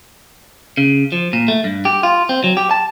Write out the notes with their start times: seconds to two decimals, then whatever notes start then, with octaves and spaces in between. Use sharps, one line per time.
0.77 C#3
1.12 F3
1.33 A#2
1.48 A3
1.64 G2
1.85 G4
2.03 F4
2.29 C4
2.44 F#3
2.57 G4
2.71 A5